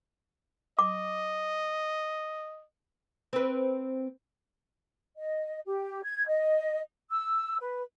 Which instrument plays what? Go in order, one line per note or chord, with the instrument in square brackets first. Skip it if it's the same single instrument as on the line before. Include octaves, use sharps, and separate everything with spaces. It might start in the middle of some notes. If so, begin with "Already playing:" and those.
[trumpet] D#5 [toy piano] D6
[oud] C4 B4
[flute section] D#5
G4
G#6
D#5
E6
B4